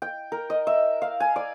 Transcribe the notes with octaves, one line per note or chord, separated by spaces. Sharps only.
G5
A#4
D#5
E5
F5
G#5
D5